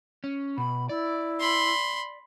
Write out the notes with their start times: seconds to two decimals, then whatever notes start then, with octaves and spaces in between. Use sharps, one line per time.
0.24 C#4
0.58 B2 B5
0.89 E4 D5
1.40 B5 C6